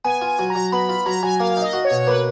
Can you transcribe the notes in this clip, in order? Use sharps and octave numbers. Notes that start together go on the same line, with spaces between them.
B3 G#5
F4
G#5
F#3
A#5
F#3
B3 B5
F4 B5
F#3 A#5
F#3 G#5
A#3 F5
F5
D#4 D#5
F#4
C#5
B2
C#5
A#3 B4